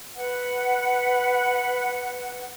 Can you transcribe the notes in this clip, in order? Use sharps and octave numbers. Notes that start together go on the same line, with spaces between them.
B4 F#5